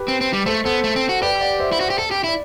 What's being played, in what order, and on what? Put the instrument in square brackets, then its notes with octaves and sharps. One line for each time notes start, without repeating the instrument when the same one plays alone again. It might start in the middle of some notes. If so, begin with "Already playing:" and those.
Already playing: [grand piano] G4 B4
[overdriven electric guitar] C4
C4
G3
[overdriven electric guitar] A3 [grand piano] A4 C5
[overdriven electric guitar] B3 [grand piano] A4 C5
[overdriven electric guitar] A3
C4
F#4
[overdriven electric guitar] G4 [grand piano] B4 D5
[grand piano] D5 F#5
C5 E5
[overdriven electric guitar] E4
F#4
G4
A4
G4
E4
[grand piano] D5